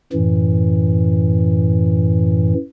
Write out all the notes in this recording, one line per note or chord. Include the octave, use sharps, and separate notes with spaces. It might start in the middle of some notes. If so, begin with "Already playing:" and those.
F#2 A2 E3